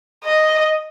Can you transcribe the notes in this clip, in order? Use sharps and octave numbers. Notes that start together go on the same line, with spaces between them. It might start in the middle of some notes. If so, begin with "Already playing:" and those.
D#5